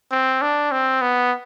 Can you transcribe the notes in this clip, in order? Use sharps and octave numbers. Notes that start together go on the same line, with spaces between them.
C4
D4
C4
B3